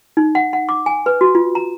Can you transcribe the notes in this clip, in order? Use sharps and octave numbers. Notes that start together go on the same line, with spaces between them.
D#4
F#5
F#5
D6
G#5
B4
F#4
F4
A#5